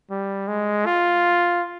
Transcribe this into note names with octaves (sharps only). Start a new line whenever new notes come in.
G3
G#3
F4